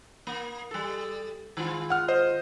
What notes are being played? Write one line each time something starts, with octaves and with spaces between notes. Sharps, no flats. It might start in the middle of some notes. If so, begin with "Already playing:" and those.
A#3
G3 A4
D#3 G#3 F4
F#5 F6
C5 D#5